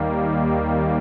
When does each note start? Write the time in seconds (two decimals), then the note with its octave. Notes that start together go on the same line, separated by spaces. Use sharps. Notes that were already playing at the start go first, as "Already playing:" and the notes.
Already playing: D#2 D#3 G3 A#3
0.24 D#4